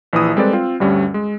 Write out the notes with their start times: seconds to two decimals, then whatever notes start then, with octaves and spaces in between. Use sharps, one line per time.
0.13 A#1 E3 E4 D#6 E6
0.36 G3 G#3 C4 A4 B4 D5
0.53 C4 F4
0.80 D2 G2 G3 C#4
1.14 G#3